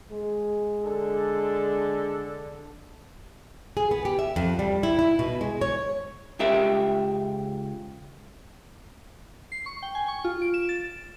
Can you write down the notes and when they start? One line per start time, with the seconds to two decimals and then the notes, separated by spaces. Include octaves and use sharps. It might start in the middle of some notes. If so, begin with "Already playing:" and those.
0.12 G#3
0.84 D3 D4 A4
3.77 G#4
3.91 B3
4.05 G4
4.19 E5
4.36 F2
4.59 G3
4.83 E4
4.99 E4
5.19 B2
5.41 G#3
5.61 C#5
6.39 C#2 C#3 G4 A#4 E5
9.52 C7
9.66 C#6
9.83 G5
9.95 G#5
10.08 C#6
10.24 F4
10.42 D7
10.54 E7
10.69 A6